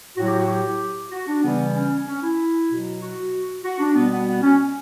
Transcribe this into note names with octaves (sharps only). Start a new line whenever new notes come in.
A2 F#3 F#4
G4
F#4
G4
F#4
D4
C#3 E3 G3 B3
C#4
C#4
E4
B2 F#3
F#4
F#4
D4
B2 G3 B3
B3
B3
C#4